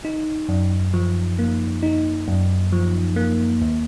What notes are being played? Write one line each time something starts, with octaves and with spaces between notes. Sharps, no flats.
D#4
F#2
F3
A#3
D#4
F#2
F3
A#3
D#2